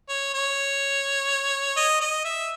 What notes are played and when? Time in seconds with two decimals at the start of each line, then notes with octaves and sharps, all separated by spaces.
0.09 C#5
0.34 C#5
1.77 D#5
2.01 D#5
2.25 E5